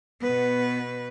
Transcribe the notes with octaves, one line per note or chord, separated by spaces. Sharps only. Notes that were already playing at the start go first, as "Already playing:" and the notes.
B2 B3 B4